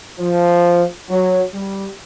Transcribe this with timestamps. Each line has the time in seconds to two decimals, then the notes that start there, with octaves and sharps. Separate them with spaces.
0.19 F3
1.08 F#3
1.54 G3